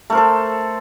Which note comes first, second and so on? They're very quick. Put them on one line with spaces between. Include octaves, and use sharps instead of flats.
A3 A#4 C5 A4